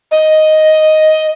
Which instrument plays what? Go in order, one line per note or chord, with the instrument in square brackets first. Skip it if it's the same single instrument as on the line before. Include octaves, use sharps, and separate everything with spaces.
[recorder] D#5